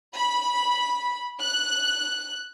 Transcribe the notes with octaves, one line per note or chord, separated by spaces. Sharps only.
B5
F#6